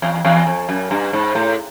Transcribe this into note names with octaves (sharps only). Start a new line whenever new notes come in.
E2
E2
F2
F#2
G2
G#2
A2